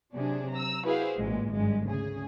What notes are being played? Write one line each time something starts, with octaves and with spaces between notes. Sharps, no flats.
C3 F#3 D4 G#4
A#5 E6
E4 F#4 G#4 B4 C5 F5
A1 A#2 G#3
G#1 G2 G#3
D2 C#3 G#4